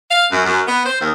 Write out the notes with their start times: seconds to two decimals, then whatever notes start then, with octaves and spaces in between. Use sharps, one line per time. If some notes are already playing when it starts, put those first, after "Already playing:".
0.10 F5
0.31 F#2
0.45 F#2
0.67 B3
0.85 C5
1.00 D#2